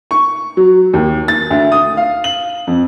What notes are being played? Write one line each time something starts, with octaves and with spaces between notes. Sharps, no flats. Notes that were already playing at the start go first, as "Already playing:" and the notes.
C#6
F#3
D#2
A6
D2
D#6
F5
F#7
F2